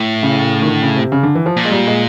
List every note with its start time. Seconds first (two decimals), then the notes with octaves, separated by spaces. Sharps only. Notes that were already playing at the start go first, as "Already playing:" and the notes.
Already playing: A2
0.23 C#3
0.62 D#3
0.68 D3
0.82 C#3
0.97 C3
1.12 C#3
1.23 D3
1.35 E3
1.46 F3
1.57 A#2
1.65 G#3
1.72 G3
1.87 G#3